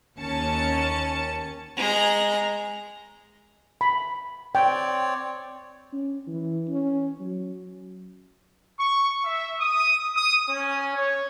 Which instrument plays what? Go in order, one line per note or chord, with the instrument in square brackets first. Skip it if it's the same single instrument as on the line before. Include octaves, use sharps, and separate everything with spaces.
[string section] D#2 C#4 A5 C#7
[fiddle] G#3 A#5
[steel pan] B5
[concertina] C4 C#5 D5 [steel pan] G5
[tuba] C#4
E3
C#4
F#3
[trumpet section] C#6
E5
D#6
D#6
C#4
C#5